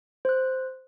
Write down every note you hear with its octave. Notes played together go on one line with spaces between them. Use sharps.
C5 F#6